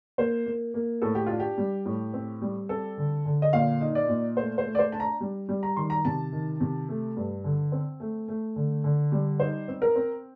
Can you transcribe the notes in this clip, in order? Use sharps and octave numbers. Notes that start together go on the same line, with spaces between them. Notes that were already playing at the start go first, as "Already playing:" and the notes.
A#3 C5
A#3
A#3
A2 A4
G4
D4 F4
G4
G3
A2
C4
G3
C4 A4
D3
D3
D#5
A#2 F5
D#4
D5
A#2
A3 C5
C5
A3
D5
C5
D4 A5
A#5
G3
G3
A#5
D#3 C6
A#5
C3 A5
D#3
C3
A3
G2
D3
C4
A3
A3
D3
D3
G3
D#4 C5
C4
A#4
C4